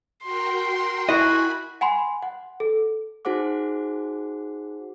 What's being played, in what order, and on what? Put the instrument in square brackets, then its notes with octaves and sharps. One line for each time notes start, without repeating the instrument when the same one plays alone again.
[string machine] F#4 A#4 G5 [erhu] C6
[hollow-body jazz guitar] E4 D#5 [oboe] F#4 [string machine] G#5 B5
[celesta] F#5 G#5 B5 C6
F#5
A4
[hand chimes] D#4 F#4 G#4 C5 F#5 D6